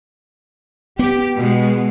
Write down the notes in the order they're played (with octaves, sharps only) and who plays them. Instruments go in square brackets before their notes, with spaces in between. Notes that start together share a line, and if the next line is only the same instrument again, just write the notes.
[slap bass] B3 [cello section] G4
[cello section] B2 G#3